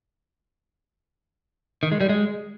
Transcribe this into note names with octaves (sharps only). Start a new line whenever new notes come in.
D#3
G#3
G3
G#3